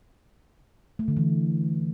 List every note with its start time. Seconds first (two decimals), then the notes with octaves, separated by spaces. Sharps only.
0.99 A3
1.08 D3
1.17 E3